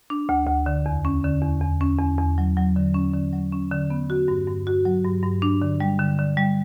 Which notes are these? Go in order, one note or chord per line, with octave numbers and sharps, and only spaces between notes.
D4
D2
D2
D3
E2
C#4
D3
E2
E2
C#4
E2
E2
F#3
F#3
D3
C#4
D3
F#3
C#4
D3
B3
F#4
G2
G2
F#4
F#3
G2
G2
D4
D3
G3
D3
D3
G3